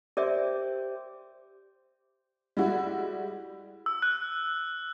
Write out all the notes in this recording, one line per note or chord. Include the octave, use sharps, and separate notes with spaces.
G4 A#4 C5 D5 E5
G3 G#3 E4 F#4
E6
F#6